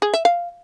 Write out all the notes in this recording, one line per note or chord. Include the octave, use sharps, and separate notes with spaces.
G#4
E5
F5